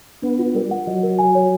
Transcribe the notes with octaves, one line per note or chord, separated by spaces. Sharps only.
B3 D4
F4
G3 A#4
F#5
F#3 D#5
A#4
G#5
C#5